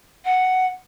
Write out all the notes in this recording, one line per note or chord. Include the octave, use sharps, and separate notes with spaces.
F#5